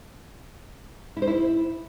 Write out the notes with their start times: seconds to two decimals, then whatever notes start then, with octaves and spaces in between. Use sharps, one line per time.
1.17 E4
1.22 C5
1.27 E4